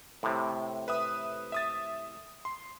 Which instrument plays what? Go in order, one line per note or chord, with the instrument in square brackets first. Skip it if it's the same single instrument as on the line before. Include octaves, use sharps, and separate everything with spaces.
[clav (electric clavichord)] A2 C3
[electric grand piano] B4 E5 D#6
E5 D#6 A6
C6